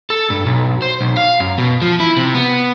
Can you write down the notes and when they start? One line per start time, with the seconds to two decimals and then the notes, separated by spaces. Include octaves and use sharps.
0.10 A4
0.30 G2
0.46 B1
0.82 C5
1.01 B1
1.17 F5
1.40 F#2
1.58 B2
1.82 F3
2.00 E4
2.17 C3
2.34 B3